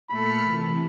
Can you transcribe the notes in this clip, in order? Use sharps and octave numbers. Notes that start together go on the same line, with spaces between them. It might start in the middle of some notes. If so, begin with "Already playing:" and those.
A#2 A3 A4 B5 F6 C#7
C3 E3